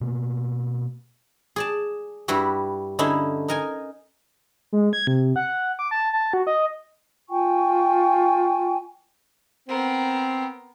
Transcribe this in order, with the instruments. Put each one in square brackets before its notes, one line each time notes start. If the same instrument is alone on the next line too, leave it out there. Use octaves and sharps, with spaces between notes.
[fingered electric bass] B2 A#3
[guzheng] G#4 D5 A5
G2 G3 E4 F#4 G4
D3 C#4 D#4 E4
D#4 A#4 G#5
[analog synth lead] G#3
G#6
C3
F#5
D6
A5
A5
F#4
D#5
[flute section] F4 G5 G#5 C#6
[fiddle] B3 A#4 [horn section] C4